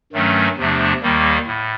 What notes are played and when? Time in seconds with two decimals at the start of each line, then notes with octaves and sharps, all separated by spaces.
0.13 G2 D#3 F#3 A3 C#4
0.57 E2 C3 F3 A3 D4
1.02 D#2 D#3 G3 A#3
1.47 A2